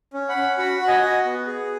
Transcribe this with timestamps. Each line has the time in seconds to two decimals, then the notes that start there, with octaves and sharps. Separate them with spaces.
0.14 C#4
0.29 F#5 B5
0.37 C#4
0.58 F#4 F#5 B5
0.81 F#4
0.87 D#5 G#5
1.03 F#4
1.25 B3
1.47 G#4